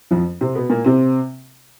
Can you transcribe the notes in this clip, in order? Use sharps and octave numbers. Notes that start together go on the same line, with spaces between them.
F2 F3
C3 C4
B2 B3
A#2 A#3
C3 C4